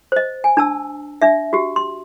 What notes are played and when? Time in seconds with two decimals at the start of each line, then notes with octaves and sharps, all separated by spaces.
0.12 C5 D#5
0.44 G#5
0.57 D4 A5 E6
1.22 D4 E5
1.53 F#4 G4
1.76 C6